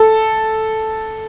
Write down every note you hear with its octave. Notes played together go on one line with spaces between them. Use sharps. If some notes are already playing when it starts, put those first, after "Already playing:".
Already playing: A4